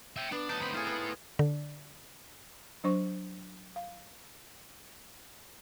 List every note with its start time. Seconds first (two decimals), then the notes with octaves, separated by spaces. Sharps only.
0.16 E5 G5
0.32 B3 D4
0.49 D2 F#3 D#4 A5
0.62 D2 C4 B5
0.74 E4 F4 G#4 A4
0.87 B3
1.39 D3
2.84 F#3 D4 C5 C#6
3.76 F5